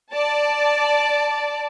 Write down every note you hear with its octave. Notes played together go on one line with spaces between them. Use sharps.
D5 A5